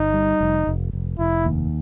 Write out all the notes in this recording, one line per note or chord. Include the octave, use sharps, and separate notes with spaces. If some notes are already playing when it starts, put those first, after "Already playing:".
Already playing: G1 D#4
G3
F1
F1
F1
F1 E4
D#2